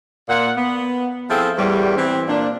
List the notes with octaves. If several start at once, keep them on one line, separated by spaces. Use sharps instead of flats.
A#2 F#5
B3
F3 C4 E4 G#4 A4
E2 A2 G3
E3 C4
A#2 D4